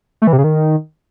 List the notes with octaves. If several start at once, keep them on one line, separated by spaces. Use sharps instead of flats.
A3
E3
C3
C#3
D#3